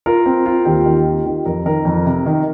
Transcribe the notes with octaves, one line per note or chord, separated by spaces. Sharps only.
F4 A#4
C4
F4
D#2 G4
D#3
F4
D#3 G4
F2 A#4
D#3 A#4
F2
C3
D#3